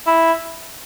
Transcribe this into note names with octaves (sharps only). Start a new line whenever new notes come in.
E4